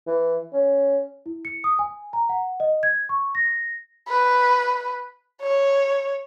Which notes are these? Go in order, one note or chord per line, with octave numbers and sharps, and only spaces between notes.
E3
C#4
E4
C#7
D#6
G#5
A#5
F#5
D#5
G#6
C#6
A#6
B4
C#5